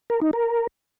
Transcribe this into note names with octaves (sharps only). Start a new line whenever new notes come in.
A#4
D#4
A#4